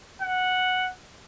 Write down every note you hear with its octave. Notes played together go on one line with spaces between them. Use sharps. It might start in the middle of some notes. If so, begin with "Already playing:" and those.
F#5